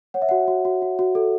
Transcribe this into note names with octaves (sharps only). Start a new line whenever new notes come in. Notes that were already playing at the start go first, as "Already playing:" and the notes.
C#5 F#5
E5
F#4 F#5
F#4
F#4
F#4
F#4
A4